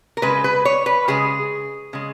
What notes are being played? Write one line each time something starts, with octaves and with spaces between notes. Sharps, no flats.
A#4
C#3 G#3 B4
B4
C#5
B4
C#3 G#3 G#4
C#3 G#3